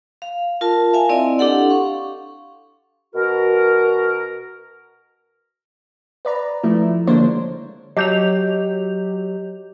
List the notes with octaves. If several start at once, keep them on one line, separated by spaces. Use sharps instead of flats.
F5
F4 A#4 A5
E5 F5 G#5
C4 E4 D5 D#5 C6
D4 G4 A4 F#5 C6
F5 C#6
B2 F#4 A#4
B4 D5 A#5
F3 A3 E4
D3 G#3 A#3 D4 C5 C#5
F#3 G4 D#5 G6 F7